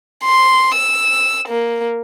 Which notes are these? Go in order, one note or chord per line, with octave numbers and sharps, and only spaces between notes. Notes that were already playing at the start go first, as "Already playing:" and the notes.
C6
E6
A#3